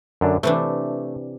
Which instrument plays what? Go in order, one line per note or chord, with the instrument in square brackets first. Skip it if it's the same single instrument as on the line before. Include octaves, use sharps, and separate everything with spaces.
[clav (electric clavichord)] F#2 D3 D4
[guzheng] C3 E3 D4 [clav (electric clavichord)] A3